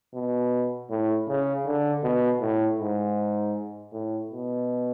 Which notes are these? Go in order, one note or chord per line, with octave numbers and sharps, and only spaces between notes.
B2
A2
C#3
D3
B2
A2
G#2
A2
B2